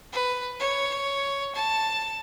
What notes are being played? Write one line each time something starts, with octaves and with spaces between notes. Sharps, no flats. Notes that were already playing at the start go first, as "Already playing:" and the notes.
B4
C#5
A5